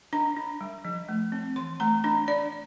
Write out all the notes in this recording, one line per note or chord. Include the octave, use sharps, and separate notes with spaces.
D4 A#5
D4
G3
F3
A3
C4
E3 C6
A3 A#5
D4 A#5
D4 D5